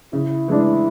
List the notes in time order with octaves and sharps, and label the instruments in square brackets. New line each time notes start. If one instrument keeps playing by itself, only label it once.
[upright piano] C#3 [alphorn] E4
[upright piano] E3 G#3 D4